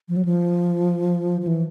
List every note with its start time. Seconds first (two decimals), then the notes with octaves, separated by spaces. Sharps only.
0.09 F3
0.16 F#3
0.25 F3
1.41 F3
1.47 E3